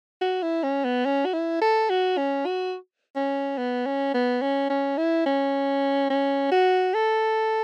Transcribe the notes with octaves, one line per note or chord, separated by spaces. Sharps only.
F#4
E4
C#4
B3
C#4
F#4
E4
A4
F#4
C#4
F#4
C#4
B3
C#4
B3
C#4
C#4
E4
C#4
C#4
F#4
A4